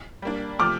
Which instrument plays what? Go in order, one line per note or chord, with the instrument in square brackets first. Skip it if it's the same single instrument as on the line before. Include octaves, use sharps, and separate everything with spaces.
[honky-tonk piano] G3 A#3 D4
[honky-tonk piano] C3 F3 A3 [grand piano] D6 F6